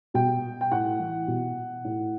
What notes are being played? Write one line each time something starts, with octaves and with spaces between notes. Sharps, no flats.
B2 G5
G5
A2 F#5
E3
B2
A2